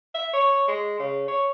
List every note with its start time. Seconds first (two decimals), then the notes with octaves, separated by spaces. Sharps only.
0.14 E5
0.33 C#5
0.68 G#3
0.99 C#3
1.28 C#5